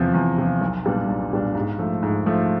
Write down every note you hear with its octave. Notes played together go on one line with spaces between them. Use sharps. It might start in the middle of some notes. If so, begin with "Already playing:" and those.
Already playing: E2 C3 F3
E2
C3 F3
B1
A#2 G3 B3 D4
B1
A#2 G3 B3 D4
G#2
F3 A3
G#2
F3 A3